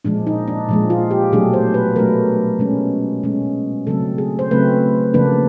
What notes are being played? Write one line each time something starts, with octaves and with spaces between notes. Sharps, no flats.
A#2 F3 G#3 D4
D#4
D4
A#2 F3 G#3
F4
G4
B2 F#3 A3 D4 G#4
C5
B4
B2 F#3 A3 D4 A#4
B2 G#3 C#4
B2 G#3 C#4
C#3 F#3 A3 C4 A4
G#4
C5
C#3 F#3 A3 C4 B4
C#3 F3 A#3 D4 B4